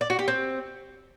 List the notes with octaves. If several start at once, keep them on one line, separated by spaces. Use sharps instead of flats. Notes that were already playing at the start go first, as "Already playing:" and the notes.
D5
F#4
G4
C4